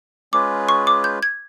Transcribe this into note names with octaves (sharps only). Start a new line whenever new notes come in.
G#3 C#4 F4 G#4 B4 D6
C#6
D6
G6
G#6